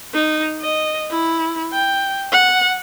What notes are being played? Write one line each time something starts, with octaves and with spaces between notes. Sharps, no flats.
D#4
D#5
E4
G5
F#5